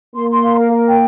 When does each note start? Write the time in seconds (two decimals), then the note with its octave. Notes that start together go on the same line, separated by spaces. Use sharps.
0.16 A#3 C6
0.30 C6
0.44 F5
0.58 A#4
0.73 A#4
0.87 G5